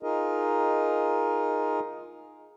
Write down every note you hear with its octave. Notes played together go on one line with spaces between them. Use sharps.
D#4 F4 G#4 A#4 D#5